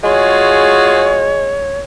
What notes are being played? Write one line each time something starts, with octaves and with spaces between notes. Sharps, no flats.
G#3 F4 F#4 G#4 C#5